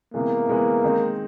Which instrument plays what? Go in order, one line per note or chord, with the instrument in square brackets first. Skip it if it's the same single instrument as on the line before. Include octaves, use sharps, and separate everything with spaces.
[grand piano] C3 E3 G#3 B3 [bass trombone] A#3
[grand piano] C3 E3 G#3 B3
D#3 G#3 C4 D#4